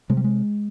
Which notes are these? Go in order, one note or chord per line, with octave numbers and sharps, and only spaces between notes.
C3 G#3
G3
G#3